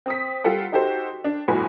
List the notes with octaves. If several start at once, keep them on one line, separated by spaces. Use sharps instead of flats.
C4 D#6 B6
G3 F4 G4 A4 F#5
D#4 F#4 G4 A4 C5
D4
G1 F2 A2 F#4 B4 G#5